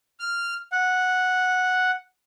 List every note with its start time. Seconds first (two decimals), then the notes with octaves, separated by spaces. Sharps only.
0.20 F6
0.72 F#5